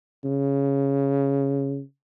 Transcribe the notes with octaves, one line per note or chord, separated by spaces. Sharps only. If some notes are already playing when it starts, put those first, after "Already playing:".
C#3